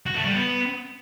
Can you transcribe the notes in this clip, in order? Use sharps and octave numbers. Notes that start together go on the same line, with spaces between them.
F#4
A3
G3
B3